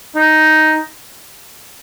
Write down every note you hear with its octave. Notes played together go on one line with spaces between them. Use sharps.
D#4